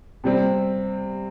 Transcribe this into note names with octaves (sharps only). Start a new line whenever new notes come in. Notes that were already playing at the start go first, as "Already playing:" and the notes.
C3 G3 C4